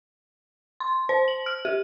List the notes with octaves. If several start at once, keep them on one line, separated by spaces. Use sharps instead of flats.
C6
C5
F#7
F6
G4